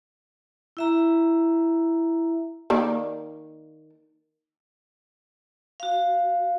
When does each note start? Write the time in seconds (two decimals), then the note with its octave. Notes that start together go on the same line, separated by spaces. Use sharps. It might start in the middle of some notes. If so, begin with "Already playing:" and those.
0.77 E4 E5 A#5
2.70 D#3 A#3 D5
5.80 F#4 F5